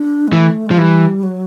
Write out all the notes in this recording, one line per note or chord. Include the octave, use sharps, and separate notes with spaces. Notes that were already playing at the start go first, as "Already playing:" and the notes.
Already playing: D4
G#3
E3 A3
F3 G#3
E3 G3
F#3